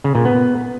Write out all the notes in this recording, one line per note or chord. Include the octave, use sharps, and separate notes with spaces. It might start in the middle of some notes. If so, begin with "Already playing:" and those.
C#3
A#2
B3